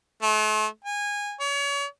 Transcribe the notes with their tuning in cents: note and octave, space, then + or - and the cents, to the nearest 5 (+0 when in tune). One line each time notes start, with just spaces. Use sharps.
A3 -40
G#5 -20
C#5 +35